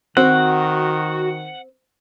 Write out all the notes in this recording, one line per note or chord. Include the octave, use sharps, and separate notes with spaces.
D#3 C4 F#4 F#5